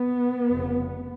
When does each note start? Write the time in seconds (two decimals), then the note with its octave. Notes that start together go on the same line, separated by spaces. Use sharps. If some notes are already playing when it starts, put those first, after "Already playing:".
Already playing: B3
0.52 F1 F2 C#3